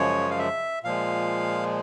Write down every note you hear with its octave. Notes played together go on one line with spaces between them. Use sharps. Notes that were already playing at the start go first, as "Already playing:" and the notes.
Already playing: F#2 C#3 F3 G#3 C#5
F5
E5
A#2 F3 G#3 F5